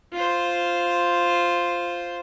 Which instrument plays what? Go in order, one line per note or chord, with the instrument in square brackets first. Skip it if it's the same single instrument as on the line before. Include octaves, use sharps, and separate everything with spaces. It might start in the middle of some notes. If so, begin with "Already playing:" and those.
[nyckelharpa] F4 C5